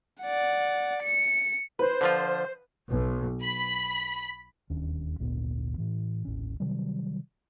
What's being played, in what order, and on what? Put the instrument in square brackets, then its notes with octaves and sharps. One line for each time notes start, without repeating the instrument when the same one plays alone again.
[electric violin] D5 F#5
C#7
[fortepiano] B4 [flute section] C5
[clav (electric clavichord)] D3 F3 F4
[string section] B1
B5
[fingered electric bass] E1 D#2 C#4 D4
G#1 D2 A#2 B3
A2 E3
D#1 A1 C#4
C3 D#3 F#3 G3